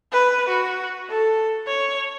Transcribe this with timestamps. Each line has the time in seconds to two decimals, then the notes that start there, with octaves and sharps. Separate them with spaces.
0.12 B4
0.48 F#4
1.09 A4
1.67 C#5